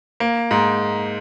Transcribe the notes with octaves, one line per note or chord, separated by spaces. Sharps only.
A#3
G#2